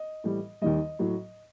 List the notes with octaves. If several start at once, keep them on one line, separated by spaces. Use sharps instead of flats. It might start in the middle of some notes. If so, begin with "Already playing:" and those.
Already playing: D#5
A2 E3 G3
D#2 D#3 G3 D#5
A2 F#3